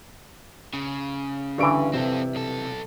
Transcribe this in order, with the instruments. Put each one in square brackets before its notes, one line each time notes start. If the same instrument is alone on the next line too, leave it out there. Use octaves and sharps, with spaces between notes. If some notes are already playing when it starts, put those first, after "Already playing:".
[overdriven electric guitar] C#3
[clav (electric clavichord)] G2 E3 [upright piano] D3 C#6 D7
[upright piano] C3 [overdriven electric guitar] C4 A4
[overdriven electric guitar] B1 A4